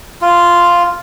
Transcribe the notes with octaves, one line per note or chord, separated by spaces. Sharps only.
F4